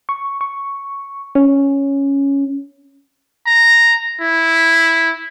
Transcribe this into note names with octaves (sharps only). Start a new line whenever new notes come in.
C#6
C#6
C#4
A#5
E4